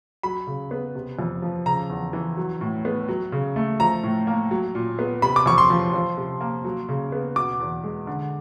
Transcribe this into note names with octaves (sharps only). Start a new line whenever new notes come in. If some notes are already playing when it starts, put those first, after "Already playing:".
F#3 B5
C#3
B3
C3
F2
F3
C#3 A#5
E2
E3
F#3
A2
B3
F#3
C#3
A3
F3 A#5
A2
A#3
F#3
A#2
B3
C3 B5
D6
F2 C#6
C6
F3
F3
C3
A#3
F#3
C#3
B3
B2 D6
E2
G#3
D3